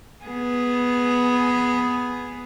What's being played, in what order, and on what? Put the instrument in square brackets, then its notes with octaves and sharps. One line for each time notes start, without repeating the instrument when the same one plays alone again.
[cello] B3 G#4